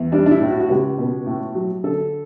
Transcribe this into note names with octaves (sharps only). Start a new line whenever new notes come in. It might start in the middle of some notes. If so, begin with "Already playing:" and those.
Already playing: E2
G3 D4
D4
E4
A2
F#4
F#4
C#2 G4
B2
A2
F#3
D3 A4